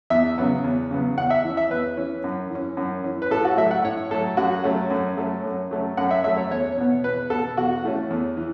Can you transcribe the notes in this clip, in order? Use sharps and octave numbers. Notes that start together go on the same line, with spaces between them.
E2 E5
C#3 F#3 B3
E2
C#3 F#3 B3
E2 F#5
E5
E3 C#4
E5
E2 B4
E3 C#4
F#2
E3 C#4
F#2
E3 C#4
B4
A2 A4
F#4
F#3 A3 E5
F#5
A2 C#5
F#3 A3 A4
F#2 F#4
F#3 A3 C#4
F#2
F#3 A3 C#4
F#2
F#3 A3 C#4
F#2 F#5
E5
F#3 A3 C#4 E5
C#5
E2 C#5
B2 B3 C#5
E2 B4
B2 B3 A4
E2 F#4
E3 A3 C#4
E2
E3